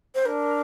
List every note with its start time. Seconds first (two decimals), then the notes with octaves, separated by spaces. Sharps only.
0.15 C5
0.25 D4 A#4